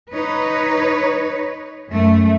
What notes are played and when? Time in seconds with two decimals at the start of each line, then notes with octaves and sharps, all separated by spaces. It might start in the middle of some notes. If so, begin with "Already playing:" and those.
0.12 D#4 B4 C#5
1.89 F#2 A3